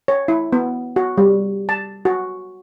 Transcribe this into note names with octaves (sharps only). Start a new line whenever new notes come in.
C#5
E4
B3
F#4
G3
A5
F#4